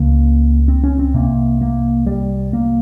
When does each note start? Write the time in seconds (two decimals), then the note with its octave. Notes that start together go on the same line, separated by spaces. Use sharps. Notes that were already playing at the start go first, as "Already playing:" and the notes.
Already playing: C#2 C#3 A#3
0.68 C4
0.84 C#4
0.99 C4
1.14 C2 C3 A#3
1.61 A#3
2.07 G3
2.53 A#3